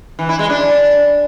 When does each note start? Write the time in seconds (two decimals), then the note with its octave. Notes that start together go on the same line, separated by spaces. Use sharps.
0.19 E3
0.29 E4
0.39 G#3
0.49 D4